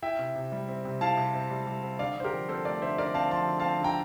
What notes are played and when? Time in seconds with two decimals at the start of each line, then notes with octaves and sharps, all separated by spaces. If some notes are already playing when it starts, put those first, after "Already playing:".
0.03 E4 E5 G5
0.19 C3
0.35 C3
0.52 G3
0.68 C4
0.85 C3
1.01 E4 F5 A5
1.17 C3
1.34 C4
1.50 G3
1.67 G3
1.83 C4
1.99 D3 D5 F5
2.16 D3 C5
2.24 G4 A#4
2.33 F3
2.49 C4 A4 C5
2.65 A3 A#4 D5
2.81 D3 C5 E5
2.98 D3 A#4 D5
3.14 C4 F5 A5
3.31 F3 A5 C6
3.48 D3
3.59 F5 A5
3.64 C4
3.80 D3 G5 A#5